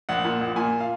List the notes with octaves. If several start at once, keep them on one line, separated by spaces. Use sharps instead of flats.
A#1 F#5
A#2
A#1
A#2 G#5
F5